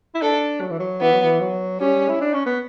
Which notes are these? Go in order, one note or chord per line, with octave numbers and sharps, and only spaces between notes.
E4
D4 A4
F#3
E3
F#3
E3 B3
F#3
E3
F#3
G3 C#4
E4
D4
C#4
B3